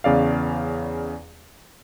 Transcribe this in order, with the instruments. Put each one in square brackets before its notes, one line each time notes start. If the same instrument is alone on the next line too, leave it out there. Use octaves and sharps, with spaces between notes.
[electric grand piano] E2 C#3 D5 F5